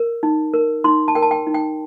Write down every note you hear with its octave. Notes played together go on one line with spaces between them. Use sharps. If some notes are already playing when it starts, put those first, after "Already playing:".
Already playing: A#4
D#4
A#4
D#4 C6
A5
A#4 G5
A5
G5
D#4
G5